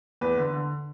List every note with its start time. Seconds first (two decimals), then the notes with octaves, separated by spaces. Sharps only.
0.21 E2 B4
0.38 D3
0.53 D3